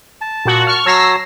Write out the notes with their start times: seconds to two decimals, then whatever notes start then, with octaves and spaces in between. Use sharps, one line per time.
0.21 A5
0.45 A#2 F#4
0.67 C#6 F6
0.86 F#3 C#5 A5 E6 A#6 C7